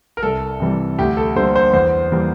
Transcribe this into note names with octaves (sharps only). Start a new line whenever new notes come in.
A#4
C2 A4
C3 E3 G3
D2 G4
A4
D3 G3 A#3 C5
C5
E2 C5
E3 G3 A#3